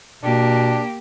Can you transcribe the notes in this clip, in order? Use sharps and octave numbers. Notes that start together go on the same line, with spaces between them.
B2 A#3 D4 G4